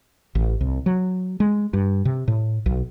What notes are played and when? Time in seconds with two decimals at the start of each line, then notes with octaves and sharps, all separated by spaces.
0.35 A1
0.61 C2
0.86 F#3
1.40 G#3
1.73 G2
2.05 C3
2.28 A2
2.66 B1